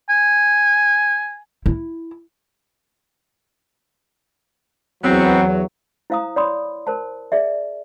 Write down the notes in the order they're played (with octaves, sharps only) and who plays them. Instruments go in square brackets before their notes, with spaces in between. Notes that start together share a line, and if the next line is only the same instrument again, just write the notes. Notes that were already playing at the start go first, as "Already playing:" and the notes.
[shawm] G#5
[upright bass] E4
[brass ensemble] E2 F#3 [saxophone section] B3 C4
[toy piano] E4 C5 F5 A#5 D#6
C#5 D5 B5 C6 D#6
A#4 C5 A5
G#4 D5 E5